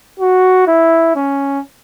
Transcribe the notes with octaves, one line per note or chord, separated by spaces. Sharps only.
F#4
E4
C#4